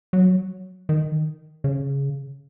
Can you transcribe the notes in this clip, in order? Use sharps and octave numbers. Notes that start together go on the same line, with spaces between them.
F#3
D#3
C#3